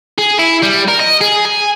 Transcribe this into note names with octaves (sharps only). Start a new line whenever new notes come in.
G#4
E4
G3
A#4
D#5
G#4
G#5